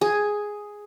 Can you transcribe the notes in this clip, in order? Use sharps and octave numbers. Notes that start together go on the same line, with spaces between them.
G#4